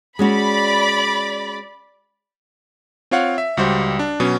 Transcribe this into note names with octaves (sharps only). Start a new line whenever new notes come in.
G#3 C#4 F#4 D5 B5
C4 F4 C#5 F5 F#5
E5
C#2 G3 F#4 C5
D4
B2 F#3 C#4